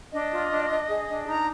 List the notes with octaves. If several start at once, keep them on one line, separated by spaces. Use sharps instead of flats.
D4 D#5
F4
D4
D4
G#4
D4
D#4 A#5